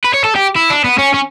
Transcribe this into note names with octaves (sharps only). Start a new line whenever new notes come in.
B4
C#5
A4
G4
E4
D4
B3
C#4
C#4